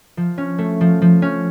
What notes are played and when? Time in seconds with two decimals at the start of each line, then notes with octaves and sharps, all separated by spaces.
0.17 F3
0.38 C#4
0.58 A3
0.81 F3
1.02 F3
1.22 C#4